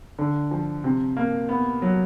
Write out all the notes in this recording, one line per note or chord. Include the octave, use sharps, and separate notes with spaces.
D3
F3
C3
A#3
B3
F#3